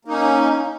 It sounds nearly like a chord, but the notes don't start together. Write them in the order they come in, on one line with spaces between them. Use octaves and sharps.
A#3 D#4 C#4